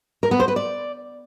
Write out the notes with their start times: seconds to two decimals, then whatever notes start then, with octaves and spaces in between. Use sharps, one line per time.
0.23 A#4
0.31 B3
0.40 C5
0.48 B4
0.56 D5